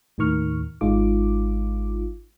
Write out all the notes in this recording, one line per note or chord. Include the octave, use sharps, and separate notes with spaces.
D#2 A2 D#3 A#4 C#6 F6
G#1 G#3 D#4 F4 D6